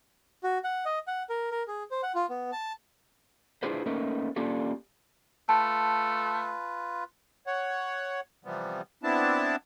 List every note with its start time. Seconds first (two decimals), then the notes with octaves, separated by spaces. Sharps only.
0.44 F#4
0.64 F#5
0.85 D#5
1.07 F#5
1.30 A#4
1.51 A#4
1.68 G#4
1.91 C5
2.03 F#5
2.15 F4
2.30 B3
2.52 A5
3.63 D4 E4 F4 G#4 B4 C5
3.86 A3 A#3 C#4 D#4 A#4 B4
4.36 A#3 C#4 D4 F4 G4 A4
5.49 A3 F4 B4 A5
7.47 C#5 F#5
8.45 C3 E3 F3 G3 B3
9.03 B3 C4 D4 E4 A5